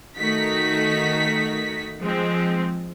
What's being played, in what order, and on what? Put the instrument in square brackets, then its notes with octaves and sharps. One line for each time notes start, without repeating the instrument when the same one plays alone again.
[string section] D#3 A3 D#4 F#4 B6
F3 G#3 C4